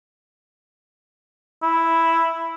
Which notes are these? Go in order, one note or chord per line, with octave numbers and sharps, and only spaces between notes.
E4